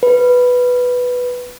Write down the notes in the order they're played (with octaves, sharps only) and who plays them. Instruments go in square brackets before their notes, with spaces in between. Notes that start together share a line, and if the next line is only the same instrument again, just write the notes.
[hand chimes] B4